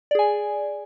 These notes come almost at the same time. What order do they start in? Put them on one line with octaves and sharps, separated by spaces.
D5 G#4 G#5